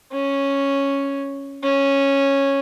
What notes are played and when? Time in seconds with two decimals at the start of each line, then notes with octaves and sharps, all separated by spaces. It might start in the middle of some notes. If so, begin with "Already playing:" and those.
0.12 C#4
1.64 C#4